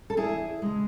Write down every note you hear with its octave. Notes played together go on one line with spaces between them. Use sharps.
A4
E2 E4 G#4
C#3 G#3